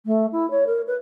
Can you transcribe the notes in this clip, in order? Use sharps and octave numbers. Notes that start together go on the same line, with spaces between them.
A3
E4
C#5
A#4
B4